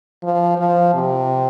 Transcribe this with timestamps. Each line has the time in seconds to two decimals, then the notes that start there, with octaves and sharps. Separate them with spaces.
0.23 F3
0.58 F3
0.94 C3